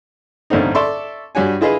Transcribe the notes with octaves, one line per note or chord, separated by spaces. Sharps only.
A1 G2 D3 A#3 C4 D#4
A4 D5 E5 C6 C#6
G2 G3 F#4 C#5 G#5
E4 F4 G#4 B4 D#5 F5